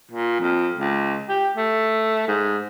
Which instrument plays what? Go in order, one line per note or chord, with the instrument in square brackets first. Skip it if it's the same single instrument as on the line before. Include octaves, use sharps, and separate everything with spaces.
[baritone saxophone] A#2
F2
C#2
G4
A3
G#2